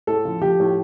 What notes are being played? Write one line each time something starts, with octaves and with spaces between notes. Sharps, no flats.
A2 A4
F3
F3 G4
A2